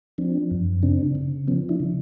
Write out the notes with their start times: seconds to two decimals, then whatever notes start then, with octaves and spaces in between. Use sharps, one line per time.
0.18 F3 C4 D4
0.51 F#2
0.83 C#3 C4 D4
1.15 C#3
1.48 F3 B3 C#4
1.69 D4 E4
1.80 C#3